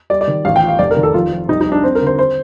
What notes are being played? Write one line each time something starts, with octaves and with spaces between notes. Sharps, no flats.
G3 D5
D5
D#3
A1 F5
G5
F3
F5
F1 D5
A#4
D#3
A4
F2 F4
F3
C2 D#4
D#4
G3
D4
G3 C4
A#4
D3
C5
C5